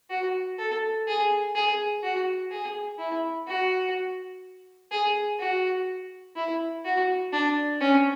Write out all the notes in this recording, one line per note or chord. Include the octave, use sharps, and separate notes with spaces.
F#4
A4
G#4
G#4
F#4
G#4
E4
F#4
G#4
F#4
E4
F#4
D4
C#4